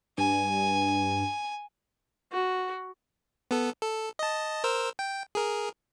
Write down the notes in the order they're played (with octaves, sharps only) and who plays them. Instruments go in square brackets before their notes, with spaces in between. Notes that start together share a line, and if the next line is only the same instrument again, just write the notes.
[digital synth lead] G2 [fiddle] G#5
[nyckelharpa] F#4
[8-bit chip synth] B3 A4
A4
D#5 A5
A#4 C5 E6
G5
G#4 A#4